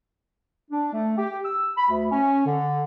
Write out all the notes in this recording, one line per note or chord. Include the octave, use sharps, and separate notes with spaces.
D4
A3
G4
E6
B5
D2
C#4
D3